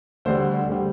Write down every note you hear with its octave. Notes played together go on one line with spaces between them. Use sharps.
D2 D3 G3 C5
D2 D3 G3